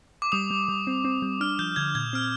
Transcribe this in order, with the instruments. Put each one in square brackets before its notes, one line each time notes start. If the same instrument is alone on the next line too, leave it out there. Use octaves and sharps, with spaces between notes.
[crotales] D6
[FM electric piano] G3 [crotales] D#6
[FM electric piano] G3
G3
C4
C4
G3
[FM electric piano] D4 [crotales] F6
[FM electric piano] F3 [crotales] G6
[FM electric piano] D3 [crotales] G#6
[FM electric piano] A#2 [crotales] G#6
[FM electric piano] C4 [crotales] F6